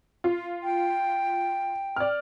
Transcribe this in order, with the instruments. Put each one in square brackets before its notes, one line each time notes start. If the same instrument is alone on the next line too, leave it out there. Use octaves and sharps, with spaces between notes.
[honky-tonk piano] F4
[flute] G5
[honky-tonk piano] D5 F6